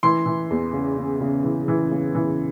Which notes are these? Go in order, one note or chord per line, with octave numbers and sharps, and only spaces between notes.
E3 C6
E3
E2
C#3
C#3
C#3
E3
E3
C#3
E3